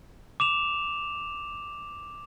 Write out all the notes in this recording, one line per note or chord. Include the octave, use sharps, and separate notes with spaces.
D6 E7 F7